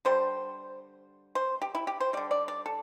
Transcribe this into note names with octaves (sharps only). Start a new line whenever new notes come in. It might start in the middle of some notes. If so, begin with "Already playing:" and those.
D3 G3 C5
C5
G4
E4
G4
C5
D3 G3 D5
D5
D5
A4